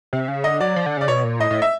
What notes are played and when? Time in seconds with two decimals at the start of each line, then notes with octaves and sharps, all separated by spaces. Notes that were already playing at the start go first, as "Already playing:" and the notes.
0.13 C3
0.28 C#3
0.44 D3 D#5
0.60 F#3 D5
0.76 F3
0.86 D3
0.97 C#3 D5
1.08 B2 C#5
1.24 A#2
1.39 A2 D#5
1.50 A2
1.62 E5